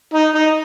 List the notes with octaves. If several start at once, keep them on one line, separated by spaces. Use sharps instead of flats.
D#4
D#4